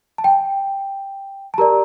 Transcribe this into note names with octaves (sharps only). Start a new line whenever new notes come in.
A5
G5
A5
G4 A#4 D5 A#5